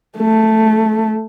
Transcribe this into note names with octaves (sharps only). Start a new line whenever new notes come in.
A3